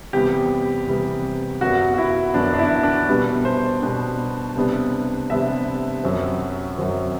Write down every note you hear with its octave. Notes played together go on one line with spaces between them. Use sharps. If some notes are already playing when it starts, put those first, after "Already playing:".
E2 C3 G3 B3 G4
E2 C3 G3 B3
F#2 F#3 B3 F#4
F#4
E4
F#2 F#3 B3 D4
D4
E4
D4
B2 G3 B3 D4 B4
C5
B2 G3 B3 D4
C3 G3 B3 D4
C3 G3 B3 D4 E5
F#2 F#3 C4
F#2 F#3 C4